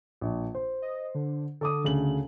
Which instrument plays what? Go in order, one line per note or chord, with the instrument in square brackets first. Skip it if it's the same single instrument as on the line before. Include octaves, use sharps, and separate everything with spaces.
[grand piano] A#1
C5
[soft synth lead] D#5
D3
[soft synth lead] D3 [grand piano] A4 D6 D#6
[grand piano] D2 C#3 F#7